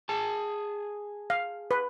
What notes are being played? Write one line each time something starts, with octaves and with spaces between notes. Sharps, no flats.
G#4 A5
F5
B4